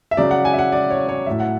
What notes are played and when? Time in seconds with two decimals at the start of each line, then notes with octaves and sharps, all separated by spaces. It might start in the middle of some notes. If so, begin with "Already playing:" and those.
0.11 E5
0.17 C#3 F#3 D5
0.31 F#5
0.45 G#5
0.54 E5
0.59 F#5
0.72 D5
0.90 C#5
1.09 C#5
1.26 A2 F#3 E5
1.40 F#5